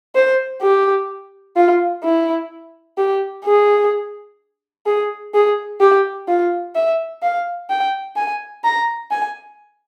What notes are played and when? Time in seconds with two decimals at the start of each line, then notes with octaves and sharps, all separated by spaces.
0.15 C5
0.62 G4
1.56 F4
2.04 E4
2.98 G4
3.45 G#4
4.86 G#4
5.34 G#4
5.80 G4
6.28 F4
6.75 E5
7.23 F5
7.70 G5
8.16 G#5
8.64 A#5
9.11 G#5